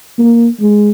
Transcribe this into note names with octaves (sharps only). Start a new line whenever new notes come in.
A#3
G#3